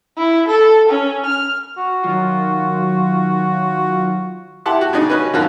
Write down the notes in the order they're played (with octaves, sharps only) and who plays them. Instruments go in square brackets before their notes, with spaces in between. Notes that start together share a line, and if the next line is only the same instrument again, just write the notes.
[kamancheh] E4
A4
C#4
F6
[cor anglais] F#4
[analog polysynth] D#3 F#3 F4
[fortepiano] E4 G4 F#5 A5 C6
F#4
C#3 D4 D#4 D#6
C#4 D#4 F#4 B4
F#2 D#3 C4 F4 F#4 A5